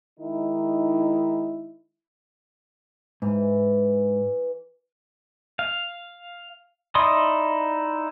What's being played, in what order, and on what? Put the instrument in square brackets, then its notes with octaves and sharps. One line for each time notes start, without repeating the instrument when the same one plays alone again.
[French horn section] D#3 G#3 D#4 E4
[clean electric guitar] G#2 [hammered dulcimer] E3
[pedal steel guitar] F5
D#4 E4 D5 C6 D#6